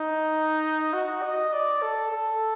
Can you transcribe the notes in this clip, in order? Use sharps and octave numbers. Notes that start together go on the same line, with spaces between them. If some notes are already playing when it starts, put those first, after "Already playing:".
Already playing: D#4
F#4
D#5
D5
A4
A4